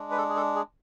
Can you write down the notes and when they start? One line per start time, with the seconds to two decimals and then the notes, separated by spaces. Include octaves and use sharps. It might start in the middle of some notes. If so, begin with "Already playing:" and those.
Already playing: G#3 D4
0.11 B4
0.18 A4
0.29 G#4
0.36 A4
0.56 G#4